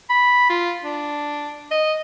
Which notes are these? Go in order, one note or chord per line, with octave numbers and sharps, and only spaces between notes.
B5
F4
D4
D#5